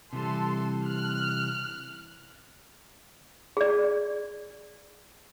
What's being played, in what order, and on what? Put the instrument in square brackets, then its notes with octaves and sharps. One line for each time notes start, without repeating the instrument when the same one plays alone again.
[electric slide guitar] C3 E3 G3 [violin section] A4 C6
[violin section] F6 F#6
[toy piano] G#4 D5